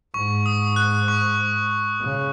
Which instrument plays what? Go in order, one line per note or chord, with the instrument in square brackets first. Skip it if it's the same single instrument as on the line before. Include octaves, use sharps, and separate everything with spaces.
[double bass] G#2 [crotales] C#6
[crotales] D#6
F#6
C#6
[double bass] C#3